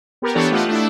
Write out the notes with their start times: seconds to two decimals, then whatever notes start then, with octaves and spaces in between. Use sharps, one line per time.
0.22 B3 G4 A#4
0.35 E3 B3 D4 G4 A4 C#5
0.52 A3 F4 G4 D#5 F#5
0.68 A3 D4 E4